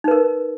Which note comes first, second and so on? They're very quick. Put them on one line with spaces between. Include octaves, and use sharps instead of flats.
D#4 B4 A#4